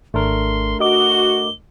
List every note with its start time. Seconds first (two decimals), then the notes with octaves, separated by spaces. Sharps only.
0.14 G#1 A3 D4 A#4 C6
0.80 F#4 D#5 D6 G7